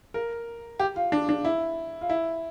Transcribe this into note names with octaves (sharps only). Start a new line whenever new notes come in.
A#4
G4
F4
D4
D4
E4
F4
E4